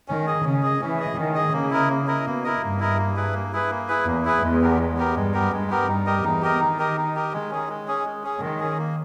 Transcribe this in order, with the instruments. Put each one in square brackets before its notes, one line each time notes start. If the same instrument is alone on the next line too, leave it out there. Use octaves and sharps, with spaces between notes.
[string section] D#3 [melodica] C#4
[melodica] G#4 D#5
[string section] C#3 [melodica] C#4
[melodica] G#4 D#5
[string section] E3 [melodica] C#4
[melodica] G#4 D#5
[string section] D#3 [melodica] C#4
[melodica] G#4 D#5
[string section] C#3 [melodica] A#3
[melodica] E4 A#4 D#5
A#3
E4 A#4 D#5
[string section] B2 [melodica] A#3
[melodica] E4 A#4 D#5
[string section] G2 [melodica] A#3
[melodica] E4 A#4 D#5
A#3
E4 G#4 B4
A#3
E4 G#4 B4
A#3
E4 G#4 B4
[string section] E2 [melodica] A#3
[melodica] E4 G#4 B4
[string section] E2 [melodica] G#3
[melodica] B3 G4 A#4
G#3
B3 G4 A#4
[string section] G2 [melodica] G#3
[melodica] B3 G4 A#4
[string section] G2 [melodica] G#3
[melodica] B3 G4 A#4
[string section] G2 [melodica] D#4
[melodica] G4 A#4 D#5
[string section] E2 [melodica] D#4
[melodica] G4 A#4 D#5
[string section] D#3 [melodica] D#4
[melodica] G4 A#4 D#5
D#4
G4 A#4 D#5
[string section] D#3 [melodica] G#3
[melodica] C#4 G#4
G#3
C#4 G#4
G#3
C#4 G#4
[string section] D#3 [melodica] G#3
[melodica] C#4 G#4
A#3